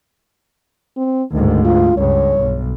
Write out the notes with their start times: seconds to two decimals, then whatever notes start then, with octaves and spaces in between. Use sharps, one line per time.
0.97 C4
1.32 D2 G#2 D#3
1.65 F4
1.98 C#2 G2 C#5
2.39 B1